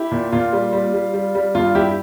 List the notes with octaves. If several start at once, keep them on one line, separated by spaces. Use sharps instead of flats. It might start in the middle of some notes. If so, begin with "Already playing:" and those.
Already playing: E4 G4
A#2
A#2 F4
G3
G3
G3
G3
G3
G2 F4
G2 E4 G4